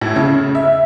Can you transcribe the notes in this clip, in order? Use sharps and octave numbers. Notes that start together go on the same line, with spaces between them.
A2
C#3
E5